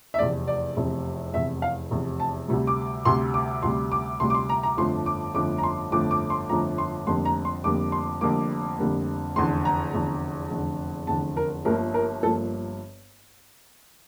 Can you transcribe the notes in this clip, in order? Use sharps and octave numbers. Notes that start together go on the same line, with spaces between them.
E5
F1 E2 C3 D5
D5
F1 E2 C3
F1 E2 C3 E5
F5
F1 E2 C3
A5
D2 C3 G3
D6
D2 C3 G3 C6
D6
D2 C3 G3 C6
D6
D2 C3 G3 C6
D6
C6
A#5
A#5
G1 F2 D3 F3 A3 C6
D6
G1 F2 D3 F3 A3 D6
A#5
C6
G1 F2 D3 F3 A3 D6
D6
C6
G1 F2 D3 F3 A3 A#5
C6
F1 F2 D3 G3 A#3 C6
A#5
C6
F1 F2 D3 G3 A#3 D6
C6
F1 F2 D3 G3 A#3 D6
F1 F2 D3 G3 A#3
F1 E2 D3 C6
A#5
F1 E2 D3
F1 E2 D3
F1 E2 D3 A5
A#4
G1 G2 F3 A#3 A#4
A#4
G1 G2 F3 A#3 A4